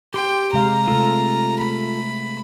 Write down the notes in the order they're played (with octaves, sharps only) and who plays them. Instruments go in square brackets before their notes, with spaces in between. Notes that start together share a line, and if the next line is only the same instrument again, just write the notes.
[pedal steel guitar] G4 C6 [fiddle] G5
[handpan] C3 G#3 F5 [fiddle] A#5
[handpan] C3 A3 [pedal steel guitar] F4 A4
[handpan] A3 [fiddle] B5